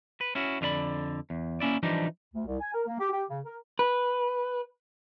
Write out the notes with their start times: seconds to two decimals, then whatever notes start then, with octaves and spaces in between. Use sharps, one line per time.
0.21 B4
0.35 C#4 E4 F#4
0.61 F2 D3 F4 D5 B5
1.30 E2
1.60 A#3 C#4 E4 D5
1.83 E3 F3 G3 D4 D#4
2.34 D2
2.46 C2
2.60 G#5
2.73 A#4
2.87 A#3
2.98 G4
3.12 G4
3.29 C#3
3.45 A#4
3.79 B4